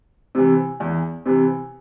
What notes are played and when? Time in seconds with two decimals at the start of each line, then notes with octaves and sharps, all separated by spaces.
0.35 C3 E3
0.80 E2
1.26 C3 E3